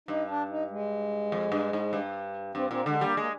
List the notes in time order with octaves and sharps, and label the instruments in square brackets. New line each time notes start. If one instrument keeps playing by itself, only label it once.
[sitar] G2 [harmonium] D#4
[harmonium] D4
D#4
G#3
[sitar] F2
G2
G#2
G2
[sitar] G2 [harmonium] C4
[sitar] A#2 [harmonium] C4
[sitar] D3 [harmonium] G#3
[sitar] G3 [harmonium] A#3
[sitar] G#3 [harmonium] A#3